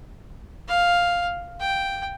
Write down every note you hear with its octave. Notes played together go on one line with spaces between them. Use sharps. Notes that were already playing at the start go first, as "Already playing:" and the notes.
F5
G5